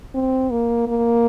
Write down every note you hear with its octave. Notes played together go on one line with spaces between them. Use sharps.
C4
A#3
A#3